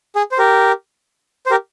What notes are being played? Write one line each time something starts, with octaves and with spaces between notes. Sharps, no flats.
G#4
C5
G4 A#4
C5
G4 A#4